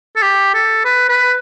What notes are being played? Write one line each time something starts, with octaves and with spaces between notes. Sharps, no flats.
A4
G4
A4
B4
B4